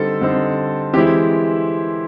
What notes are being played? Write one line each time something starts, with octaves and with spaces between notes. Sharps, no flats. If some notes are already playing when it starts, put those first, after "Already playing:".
Already playing: D3 G3 C4 D#4 A4
D3 G3 C4 D#4
E3 G#3 C4 E4 G4